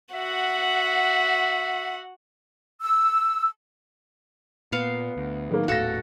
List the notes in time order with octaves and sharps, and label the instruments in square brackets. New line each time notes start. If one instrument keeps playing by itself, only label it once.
[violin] F#4 F#5 [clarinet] E5
[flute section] E6
[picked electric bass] A#2 [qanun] B3 F5
[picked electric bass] D2
[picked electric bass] A2 F#3 [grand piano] D#3 A#3
[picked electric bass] D#1 A2 [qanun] F#4 A4 [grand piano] F5 A#6